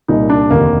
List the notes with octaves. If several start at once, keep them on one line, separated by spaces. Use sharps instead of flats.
C2 A#2 D#4
D4
F1 D#2 D3 A#3